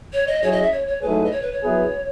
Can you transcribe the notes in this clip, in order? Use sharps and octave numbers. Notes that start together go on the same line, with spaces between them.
C#5
D#5
F#3 C#4 E4 G#4 C#5
D#5
E5
C#5
C#5
G#2 F#3 A3 E4 G#4 B4
D#5
C#5
B4
C#5
F#3 B3 E4 G#4 B4